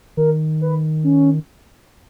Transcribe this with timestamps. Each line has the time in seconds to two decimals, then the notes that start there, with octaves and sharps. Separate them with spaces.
0.17 D#3 A#4
0.61 B4
1.04 C#4